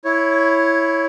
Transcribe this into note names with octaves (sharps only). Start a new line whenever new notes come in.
E4 C#5